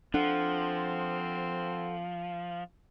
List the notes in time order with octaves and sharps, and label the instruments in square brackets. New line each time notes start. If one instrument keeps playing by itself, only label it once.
[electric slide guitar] F3 [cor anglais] C4 [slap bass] D4 [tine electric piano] A4 F#5